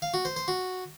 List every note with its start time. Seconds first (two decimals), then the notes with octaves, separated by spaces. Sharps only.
0.02 F5
0.14 F#4
0.25 C5
0.36 C5
0.48 F#4